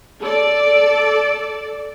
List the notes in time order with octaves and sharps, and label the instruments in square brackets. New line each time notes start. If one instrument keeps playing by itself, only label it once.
[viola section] A4 D5